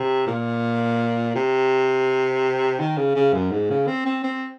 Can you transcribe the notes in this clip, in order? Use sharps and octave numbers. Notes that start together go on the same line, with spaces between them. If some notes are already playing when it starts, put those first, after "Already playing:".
Already playing: C3
A#2
C3
D#3
C#3
C#3
F#2
G#2
C#3
C4
C4
C4